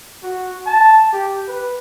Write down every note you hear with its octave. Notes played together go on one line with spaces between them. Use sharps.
F#4
A5
G4
B4